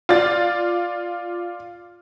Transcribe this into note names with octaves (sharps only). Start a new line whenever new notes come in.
F4 D5 A6